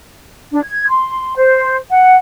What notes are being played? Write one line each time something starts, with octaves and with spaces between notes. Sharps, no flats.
D4
G#6
C6
C5
F#5